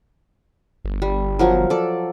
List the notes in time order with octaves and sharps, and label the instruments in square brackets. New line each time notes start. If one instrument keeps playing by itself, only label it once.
[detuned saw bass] G1
[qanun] G3
F3 F#3 A#4
A4 D5